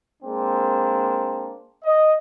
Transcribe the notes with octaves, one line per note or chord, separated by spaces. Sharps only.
G#3 A#3 C4 D4
D#5